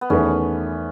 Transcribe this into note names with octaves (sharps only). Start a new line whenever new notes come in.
B3
E2 D#3 A3 C#4 E4 B4